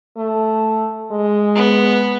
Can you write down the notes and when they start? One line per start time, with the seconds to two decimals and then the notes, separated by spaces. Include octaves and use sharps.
0.17 A3
1.11 G#3
1.56 B3